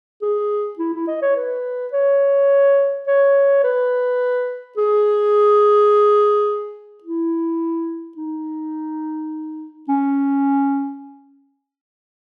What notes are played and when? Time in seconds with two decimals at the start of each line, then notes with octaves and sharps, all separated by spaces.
0.22 G#4
0.79 E4
0.94 E4
1.08 D#5
1.22 C#5
1.36 B4
1.93 C#5
3.07 C#5
3.63 B4
4.77 G#4
7.04 E4
8.17 D#4
9.88 C#4